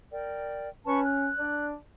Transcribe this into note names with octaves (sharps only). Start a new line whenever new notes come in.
A#4 D5 G5
C#4 B4 A5 C#6
F#6
D4 D5